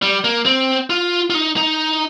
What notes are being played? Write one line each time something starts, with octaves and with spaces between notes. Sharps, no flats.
G3
A#3
C4
F4
F4
D#4
D#4